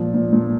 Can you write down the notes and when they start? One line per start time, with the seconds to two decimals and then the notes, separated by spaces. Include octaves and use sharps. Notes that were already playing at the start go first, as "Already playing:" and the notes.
Already playing: A#2 F3
0.14 A#2
0.33 A#2